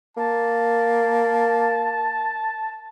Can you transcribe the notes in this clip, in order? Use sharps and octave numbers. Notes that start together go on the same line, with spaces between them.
A#3 A5